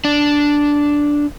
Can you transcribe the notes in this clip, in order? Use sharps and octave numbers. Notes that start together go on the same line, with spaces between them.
D4